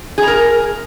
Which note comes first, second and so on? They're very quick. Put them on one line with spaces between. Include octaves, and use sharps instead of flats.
G#4 A#5 A#4